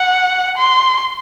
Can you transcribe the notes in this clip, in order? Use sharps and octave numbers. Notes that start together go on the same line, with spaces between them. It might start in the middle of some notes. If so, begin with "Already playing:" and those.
Already playing: F#5
C6